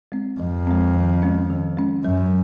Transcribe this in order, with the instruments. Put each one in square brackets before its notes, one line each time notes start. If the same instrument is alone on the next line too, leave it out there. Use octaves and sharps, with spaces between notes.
[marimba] G#3 C4
[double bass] F2 [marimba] F3
[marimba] G#3 C4
D#3
G#3 C#4
D#3
G#3 C#4
[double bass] F#2 [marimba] F#3